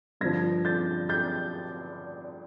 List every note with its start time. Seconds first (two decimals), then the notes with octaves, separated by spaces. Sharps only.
0.21 G2 D3 F3 G#6 A#6
0.65 G6 A6
1.09 G6 A6